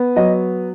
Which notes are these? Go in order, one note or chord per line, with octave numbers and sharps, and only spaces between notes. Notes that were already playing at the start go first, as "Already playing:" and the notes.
Already playing: B3
F#3 D#5